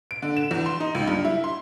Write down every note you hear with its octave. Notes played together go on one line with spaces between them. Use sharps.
D7
D3
E7
E2
C6
D#4
C#2
G2
E4
C6